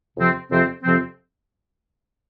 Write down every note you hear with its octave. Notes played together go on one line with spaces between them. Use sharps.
F2 C3 F3 C4
F2 C3 F3 C4
F2 C3 F3 C4